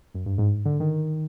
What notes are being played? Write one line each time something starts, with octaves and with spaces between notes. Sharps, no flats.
F#2
G2
G#2
D3
D#3